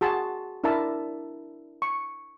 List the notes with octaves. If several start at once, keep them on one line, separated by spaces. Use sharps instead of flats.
F#4 G#4 A5 C6
D4 E4 A#4 E5 A5
C#6